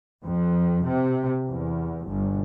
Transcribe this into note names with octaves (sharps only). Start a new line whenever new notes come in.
F2
C3
E2
G1